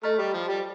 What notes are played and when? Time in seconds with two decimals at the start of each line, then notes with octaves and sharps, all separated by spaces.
0.03 A3 A4 D#5 A#5 F6
0.18 G3
0.33 F3
0.48 G3